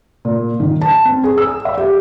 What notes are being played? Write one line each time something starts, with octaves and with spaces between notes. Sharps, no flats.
A#2
D#3
A5
C4
G#4
E6
E5
G4